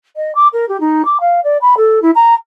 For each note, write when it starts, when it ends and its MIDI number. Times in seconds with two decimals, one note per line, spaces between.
0.16 0.31 75
0.35 0.47 86
0.53 0.67 70
0.68 0.79 67
0.80 1.02 63
1.05 1.17 86
1.20 1.40 77
1.43 1.57 74
1.61 1.74 83
1.77 2.01 69
2.02 2.10 64
2.15 2.34 82